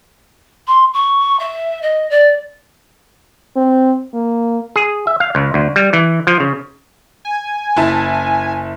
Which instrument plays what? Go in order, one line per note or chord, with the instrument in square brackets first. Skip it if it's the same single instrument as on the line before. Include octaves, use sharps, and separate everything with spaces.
[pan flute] C6
C#6
E5
D#5
D5
[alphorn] C4
A#3
[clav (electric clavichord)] G#4
E5
F5
C#2
D2
G3
E3
F3
C#3
[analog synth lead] G#5
[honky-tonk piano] F#1 E4 A5